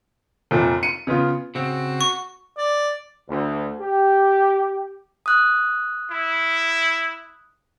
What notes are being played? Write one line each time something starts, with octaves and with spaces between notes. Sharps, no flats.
F1 A#2
C#7 D#7
C#3 B3 F4
C#3 C4 F#4
C#6
D5
D2
G4
D#6 F#6
E4